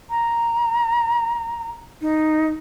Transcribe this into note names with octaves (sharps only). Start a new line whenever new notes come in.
A#5
D#4